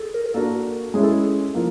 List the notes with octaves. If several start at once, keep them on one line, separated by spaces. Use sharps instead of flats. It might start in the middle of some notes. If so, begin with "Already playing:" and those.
Already playing: G#4 A4
A#4
A#4
A#3 D4 F#4 A4
G#3 C#4 E4 G#4
A4
G#4
F3 A#3